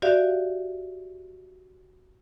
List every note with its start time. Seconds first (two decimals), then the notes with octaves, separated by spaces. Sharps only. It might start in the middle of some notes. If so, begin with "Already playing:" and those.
0.02 F#4 G4 D5 E5 F5